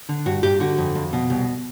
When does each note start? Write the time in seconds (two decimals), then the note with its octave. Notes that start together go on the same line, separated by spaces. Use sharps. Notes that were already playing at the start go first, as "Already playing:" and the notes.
0.09 D3
0.26 G2 F#4
0.43 G2 G4
0.60 D3 F#4
0.78 F2
0.95 F2
1.13 B2
1.30 C2